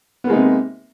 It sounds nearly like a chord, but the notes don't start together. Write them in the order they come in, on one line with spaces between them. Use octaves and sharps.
B3 A#3 G#3 D#4 C3